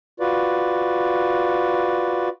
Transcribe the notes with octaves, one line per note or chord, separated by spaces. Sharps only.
F4 F#4 B4 D5